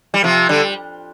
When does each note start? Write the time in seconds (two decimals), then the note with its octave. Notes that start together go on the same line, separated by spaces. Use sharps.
0.14 G3
0.24 C3 F3
0.49 D3 G3